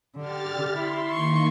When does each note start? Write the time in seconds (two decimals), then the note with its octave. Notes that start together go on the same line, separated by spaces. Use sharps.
0.17 D3 G4 F6 A6
0.73 E4 C6
1.11 D#3 A#3 C6 C#6